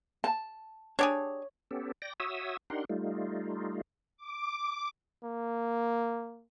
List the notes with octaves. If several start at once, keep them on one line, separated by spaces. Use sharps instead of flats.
A5
D4 G4 G#4 C#5
B3 C#4 G4 A4
D5 G5 A#6
F#4 C#5 E5 D#6 E6
D4 D#4 G4 A#4 F#5 C6
G3 A3 D#4 F4
D6
A#3